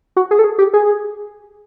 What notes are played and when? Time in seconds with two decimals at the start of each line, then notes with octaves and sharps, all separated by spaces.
0.16 F#4
0.31 G#4
0.39 A4
0.44 G#4
0.58 G4
0.74 G#4